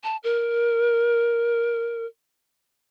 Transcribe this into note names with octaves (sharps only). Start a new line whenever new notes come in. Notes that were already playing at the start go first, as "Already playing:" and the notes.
A5
A#4